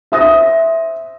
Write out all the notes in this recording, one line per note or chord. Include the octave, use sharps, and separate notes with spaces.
C5 E5 D#6 A#6